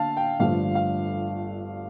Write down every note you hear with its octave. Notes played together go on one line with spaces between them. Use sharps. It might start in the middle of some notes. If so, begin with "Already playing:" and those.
Already playing: D3 F5 A5
G5
G1 G2 D3 F3 A3 F5
F5